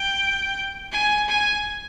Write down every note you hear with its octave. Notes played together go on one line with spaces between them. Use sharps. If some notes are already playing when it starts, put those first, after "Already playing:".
Already playing: G5
G#5
G#5